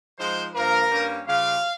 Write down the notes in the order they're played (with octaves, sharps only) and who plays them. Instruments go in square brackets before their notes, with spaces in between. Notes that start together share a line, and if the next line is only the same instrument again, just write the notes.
[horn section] F3 G#3 D#4 C5
G2 F3 A#3 A#4
G2 G3 A#3 C#4
C#3 G3 C#4 F4 F5